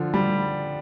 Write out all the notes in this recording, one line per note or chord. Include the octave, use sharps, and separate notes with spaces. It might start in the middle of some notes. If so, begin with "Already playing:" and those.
Already playing: D3 F3
G3